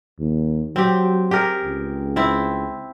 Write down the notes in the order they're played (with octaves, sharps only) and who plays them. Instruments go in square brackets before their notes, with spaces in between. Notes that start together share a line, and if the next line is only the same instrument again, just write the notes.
[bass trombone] D#2
[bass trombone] F#3 [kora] C4 G4
[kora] G4 G#4 A#4
[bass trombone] C#2
[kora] C4 E4